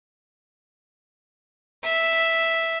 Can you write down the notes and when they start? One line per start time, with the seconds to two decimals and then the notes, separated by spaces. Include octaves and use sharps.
1.84 E5